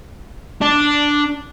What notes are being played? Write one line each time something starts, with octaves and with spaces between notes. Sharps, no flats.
D4